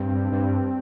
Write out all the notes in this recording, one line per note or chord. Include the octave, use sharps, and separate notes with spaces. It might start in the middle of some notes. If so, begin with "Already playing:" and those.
Already playing: G2 C4
G2